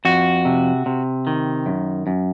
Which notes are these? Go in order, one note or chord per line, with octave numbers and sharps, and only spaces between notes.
F2 F#4
C3
C3
D#3
F#2
F#2